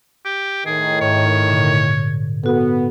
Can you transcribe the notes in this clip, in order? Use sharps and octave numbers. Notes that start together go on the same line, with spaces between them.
G4
A2 D#3 G#4
G#2 C#5
A#2 D3
B3 F#4 A4